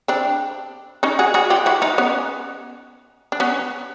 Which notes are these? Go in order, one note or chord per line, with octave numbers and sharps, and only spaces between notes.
C4 D4
C#4 D#4
F#4 G#4
F#4 G#4
F4 G4
E4 F#4
D#4 F4
B3 C#4
D4
B3 C#4